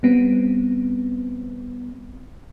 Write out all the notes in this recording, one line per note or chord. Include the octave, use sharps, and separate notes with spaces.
G3 B3 C4